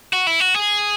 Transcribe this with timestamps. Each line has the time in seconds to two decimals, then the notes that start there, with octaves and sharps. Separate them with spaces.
0.13 F#4
0.27 E4
0.40 F#4
0.55 G#4